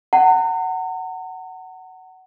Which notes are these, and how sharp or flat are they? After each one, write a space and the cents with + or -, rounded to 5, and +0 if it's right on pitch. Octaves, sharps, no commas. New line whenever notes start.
F#5 +15 A#5 -40